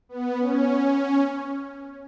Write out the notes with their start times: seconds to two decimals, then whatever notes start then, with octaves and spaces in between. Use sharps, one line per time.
0.09 B3
0.39 C#4